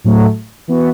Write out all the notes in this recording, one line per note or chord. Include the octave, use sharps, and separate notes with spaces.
A2 F#3 A3
E3 B3 F#4